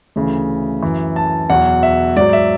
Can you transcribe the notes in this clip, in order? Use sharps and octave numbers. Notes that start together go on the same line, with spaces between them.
D2 C#3 E3
F#2 E3
A5
E2 B2 F#3 F#5
E5
G#2 F#3 D5
E5